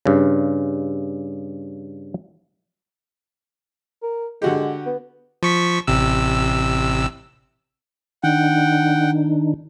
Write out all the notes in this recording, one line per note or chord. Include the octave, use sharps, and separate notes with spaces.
G2 C#3
A#4
D3 G#3 F#4 G4
B3
F3 C#6 B6
A1 C3 E6
D#3 D4 D#4 F#5 G5